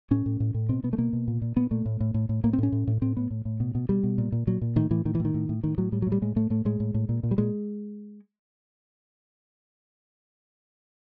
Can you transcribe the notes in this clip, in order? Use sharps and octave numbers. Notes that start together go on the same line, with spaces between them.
A2 C#4
A2
A2
A2
B2 C4
B2 B3
A3
B2 A#3
B2
A#2
A#2
A#2 B3
A#2 A3
A2
A2
A2
A2
A2 A#3
C4
A2 C#4
A2
A2
A2 C4
A2 B3
A2
A2
B2
B2
B2 G3
B2
A#2
A#2
A#2 F#3
A#2
A2 D#3
A2 E3
A2 D#3
E3
A2
D#3
A2
A2
A2 D#3
A2 F#3
A2 G3
F#3
A2
G3
A2 G#3
A2 A3
A2 A3
A2 G#3
A2
A2
A#2
A#2
G3
A#2 G#3